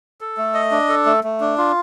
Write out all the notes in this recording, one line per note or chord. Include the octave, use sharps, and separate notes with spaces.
A4
A3
D#5
D4
A4
A3
A3
D4
F4